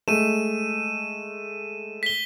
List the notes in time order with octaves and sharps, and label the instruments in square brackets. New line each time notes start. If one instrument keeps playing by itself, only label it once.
[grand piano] G#3 A3 [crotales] D#7 E7
[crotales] B6 G7